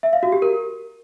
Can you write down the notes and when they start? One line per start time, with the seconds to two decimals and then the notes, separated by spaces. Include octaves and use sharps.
0.03 E5
0.13 F5
0.23 F#4
0.32 G4
0.42 A#4